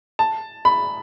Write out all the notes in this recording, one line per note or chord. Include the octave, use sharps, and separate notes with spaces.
A5
B5